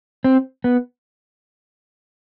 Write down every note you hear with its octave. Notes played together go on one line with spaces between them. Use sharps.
C4
B3